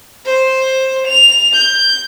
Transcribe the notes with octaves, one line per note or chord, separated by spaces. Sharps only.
C5
F7
G6